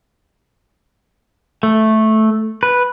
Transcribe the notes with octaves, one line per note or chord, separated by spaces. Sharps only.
A3
B4